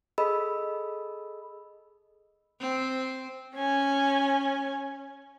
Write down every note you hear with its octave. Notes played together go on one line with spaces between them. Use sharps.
G#4 A4 D#5 B5 E6
C4
C#4 G#5